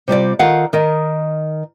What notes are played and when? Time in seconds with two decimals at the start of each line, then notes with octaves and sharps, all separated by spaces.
0.08 C3 G3 F4 D5
0.39 D#3 F4 A4 F5 F#5
0.73 D#3 A#4 D#5